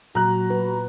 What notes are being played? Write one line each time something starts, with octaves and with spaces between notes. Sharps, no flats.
A#2 F#3 F#4 A#5 F#6
B4